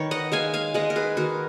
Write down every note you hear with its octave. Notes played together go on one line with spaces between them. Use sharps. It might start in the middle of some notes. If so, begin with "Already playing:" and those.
Already playing: D#3 B4 C#5
D#5 F#5
G#3 F5 G#5
F5 G#5
G#3 D#5 F#5
A#4
G#4 B4
D#3 F#4 A#4